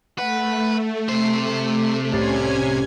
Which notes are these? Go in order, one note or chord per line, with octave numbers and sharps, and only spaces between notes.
A3 B4 F#5
C3 C5
C2 A2 C#4 G#5 G#6 A6